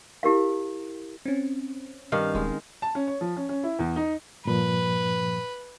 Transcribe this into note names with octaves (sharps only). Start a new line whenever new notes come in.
E4 G4 A#4 F5
C4 C#4
G2 D#3 F5
D#1 G#3
A5
C#4
C#5
F3
C#4
C#4
E4
E2
D#4
G2 A#2 F3 B4